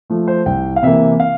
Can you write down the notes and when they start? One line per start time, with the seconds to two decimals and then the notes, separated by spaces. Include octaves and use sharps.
0.10 F3 A3
0.28 C5
0.46 C2 G5
0.76 F5
0.83 C3 E3 A#3 E5
1.20 F5